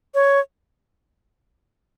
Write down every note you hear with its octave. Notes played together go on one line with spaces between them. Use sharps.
C#5